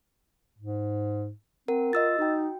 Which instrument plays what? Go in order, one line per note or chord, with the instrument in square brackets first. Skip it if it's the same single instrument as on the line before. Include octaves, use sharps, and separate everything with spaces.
[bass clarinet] G#2
[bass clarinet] C4 [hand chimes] A#4 F#5
[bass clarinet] F4 [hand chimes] D#5 E6 A6
[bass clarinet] D#4 [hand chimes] F#4 G5